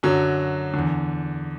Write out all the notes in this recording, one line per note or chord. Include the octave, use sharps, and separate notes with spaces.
F#2 D3 F#3
E2 D3